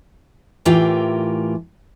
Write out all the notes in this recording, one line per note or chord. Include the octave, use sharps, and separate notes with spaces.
A2 E3 F4 G4 A#4